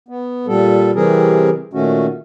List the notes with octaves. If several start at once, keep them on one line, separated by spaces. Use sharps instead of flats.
B3
A#2 G3 A4
C3 E3 G3 C4 G#4 A#4
A#2 D#3 A3 C#4 F#4